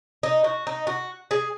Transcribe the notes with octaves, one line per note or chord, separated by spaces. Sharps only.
D#4
F#4
D#4
F#4
G#4